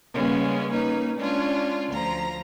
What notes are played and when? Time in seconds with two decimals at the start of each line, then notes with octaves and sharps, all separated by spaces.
0.14 C#3 G3 G#3 A#3 B3 C#4
0.71 A#3 C#4 D#4 B4
1.18 G#3 C#4 D4 F4
1.89 D2 F3 A#5